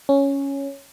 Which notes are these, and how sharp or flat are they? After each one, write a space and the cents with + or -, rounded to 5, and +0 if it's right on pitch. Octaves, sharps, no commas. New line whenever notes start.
C#4 +0